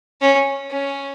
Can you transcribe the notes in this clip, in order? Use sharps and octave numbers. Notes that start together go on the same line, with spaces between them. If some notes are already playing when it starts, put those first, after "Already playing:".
C#4
C#4